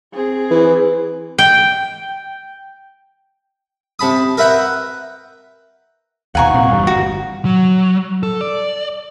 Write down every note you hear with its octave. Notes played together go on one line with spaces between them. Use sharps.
C4 G#4
E3
G5
C3 A5 B5 D#6
A#4 B4 E5 F#5 G5 A#5
D#2 B2 F5 F#5 G#5 A#5 C#6
C2 A#2 C4
G1 E2 G3
D1 G1 F#4
F#3
A4
D5